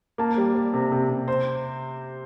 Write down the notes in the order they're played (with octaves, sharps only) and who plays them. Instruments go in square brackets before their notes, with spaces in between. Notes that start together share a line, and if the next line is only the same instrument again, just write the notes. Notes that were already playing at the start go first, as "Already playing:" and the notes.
[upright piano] A#3 A5
G3
G3
C3
C3
C3
C5